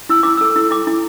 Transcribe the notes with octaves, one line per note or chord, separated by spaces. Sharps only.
E4 E6
E4 D6
A4 E6
E4
E4 D6
E4